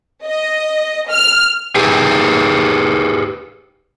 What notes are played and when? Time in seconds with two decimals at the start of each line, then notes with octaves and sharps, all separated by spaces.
0.24 D#5
1.10 F6
1.75 G4 G#4 B4